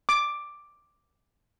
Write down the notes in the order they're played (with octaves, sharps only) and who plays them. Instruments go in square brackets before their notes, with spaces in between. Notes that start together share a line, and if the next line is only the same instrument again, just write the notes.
[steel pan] D6